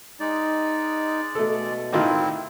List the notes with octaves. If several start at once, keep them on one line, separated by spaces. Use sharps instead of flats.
G#3 D#4 D5
B2 A3 A4
A2 D#3 C4 E4 F4